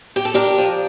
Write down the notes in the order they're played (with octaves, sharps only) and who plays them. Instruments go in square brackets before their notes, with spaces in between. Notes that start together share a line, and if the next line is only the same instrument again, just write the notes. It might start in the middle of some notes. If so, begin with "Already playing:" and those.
[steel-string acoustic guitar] G4
A4
D4 G4 A#4
F3